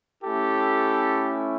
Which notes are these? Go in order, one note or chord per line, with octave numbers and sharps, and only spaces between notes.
A3 C#4 E4 G4 A4